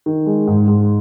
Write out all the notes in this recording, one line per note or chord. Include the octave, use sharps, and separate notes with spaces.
D#3
G#3
G#2
G#2